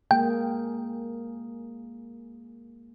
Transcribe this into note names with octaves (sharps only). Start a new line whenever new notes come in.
G#3 A#3 G#4 G5